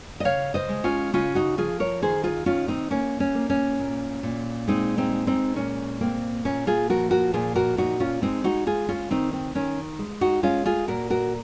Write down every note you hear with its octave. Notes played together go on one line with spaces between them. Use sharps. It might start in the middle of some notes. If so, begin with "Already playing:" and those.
D#5
C#3 C#5 F5
C5 D#5
G#3
C#4 F4
C#3 C#4 F4
D#4 F#4
F3 F4 G#4
A#4 C#5
D#3 G#4 C5
F4 G#4
D#3 C#4 F4
C4 D#4
A#3 C#4
C#4
A#3
C#4
A#2
A#2
G#3 C4 D#4
C4 D#4
G#3
C4 D#4
A#2 C#4
A#3 C4
A#2 C#4
F4 G#4
F3 F#4 A#4
F#4 A#4
A#2 F4 G#4
F#4 A#4
A#2 D#4 F#4
C#4 F4
G#3 C4 D#4
D#4 F#4
G#3 F4 G#4
C#4 F4
D#3 C4 D#4
C4
D#3 C#4
G#3
D#4 F#4
G#3 C#4 F4
F4 G#4
A#2 F#4 A#4
F#4 A#4